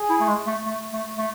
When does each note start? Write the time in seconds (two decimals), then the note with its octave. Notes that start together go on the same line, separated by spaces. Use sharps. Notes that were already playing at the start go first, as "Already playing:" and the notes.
Already playing: G#4
0.09 E4
0.20 A3
0.28 G#3
0.47 A3
0.66 A3
0.93 A3
1.18 A3